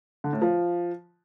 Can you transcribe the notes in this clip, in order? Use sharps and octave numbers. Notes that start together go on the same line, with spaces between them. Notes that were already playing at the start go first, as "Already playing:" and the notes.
D3
A2
F3